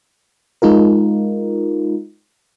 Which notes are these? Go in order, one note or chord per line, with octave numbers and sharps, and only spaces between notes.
G#3 D#4 F4 A#4